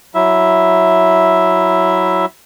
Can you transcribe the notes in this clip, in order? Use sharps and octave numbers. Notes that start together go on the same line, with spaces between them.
F#3 E4 E5